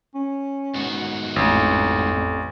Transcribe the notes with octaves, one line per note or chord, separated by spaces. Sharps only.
C#4
G#2 B3 F#4
A1 F2